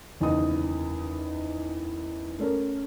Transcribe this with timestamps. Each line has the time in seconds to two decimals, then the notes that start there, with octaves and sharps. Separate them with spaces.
0.20 F#1 E2 D#3 E4 D#5 D#6
2.39 A3 C#4 A#4